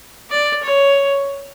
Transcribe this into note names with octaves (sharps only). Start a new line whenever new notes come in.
D5
C#5